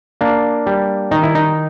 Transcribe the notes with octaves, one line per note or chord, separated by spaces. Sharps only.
A#3 D4
G3
D#3 D#4
E4
D#4